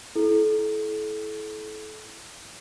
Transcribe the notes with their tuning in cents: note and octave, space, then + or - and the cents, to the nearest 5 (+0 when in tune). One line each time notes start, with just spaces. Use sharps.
E4 +0 A4 -35